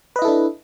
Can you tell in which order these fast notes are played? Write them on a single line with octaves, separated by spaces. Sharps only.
B4 D#5 E4 A4 D4